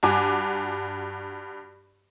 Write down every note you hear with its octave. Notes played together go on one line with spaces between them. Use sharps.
G2 F#4 G#5 D6